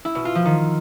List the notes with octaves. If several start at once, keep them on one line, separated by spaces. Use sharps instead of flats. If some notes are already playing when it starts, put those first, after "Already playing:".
E4
B2
F4
F3
D#3